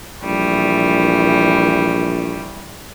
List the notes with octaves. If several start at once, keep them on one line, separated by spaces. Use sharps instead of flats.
A#1 E3 G3 A3